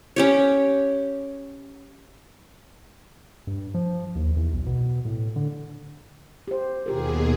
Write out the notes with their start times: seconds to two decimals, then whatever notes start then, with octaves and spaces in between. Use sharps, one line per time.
0.16 C#4 G4 C#5
3.47 G2
3.74 F3
4.16 D#2
4.37 E2
4.53 B1
4.67 B2
5.05 A2
5.36 D3
6.48 G4 C5
6.86 D#2 B2 F4 G4 G#4 A#4